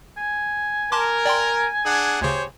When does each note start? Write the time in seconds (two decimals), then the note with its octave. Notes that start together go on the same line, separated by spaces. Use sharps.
0.17 G#5
0.92 A#4 G#5 A5 C6 D6
1.25 D5 G5 C6
1.85 D4 G#4 F#5
2.21 D2 C#3 G4 C5 C#5